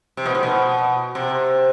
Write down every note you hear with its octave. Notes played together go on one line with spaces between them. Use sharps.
C3
B2
A2
B2
C3